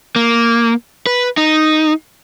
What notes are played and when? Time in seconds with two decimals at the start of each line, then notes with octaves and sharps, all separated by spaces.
0.16 A#3
1.06 B4
1.37 D#4